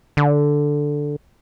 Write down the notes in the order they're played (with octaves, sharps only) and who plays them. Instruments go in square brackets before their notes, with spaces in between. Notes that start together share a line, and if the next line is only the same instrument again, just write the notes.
[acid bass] D3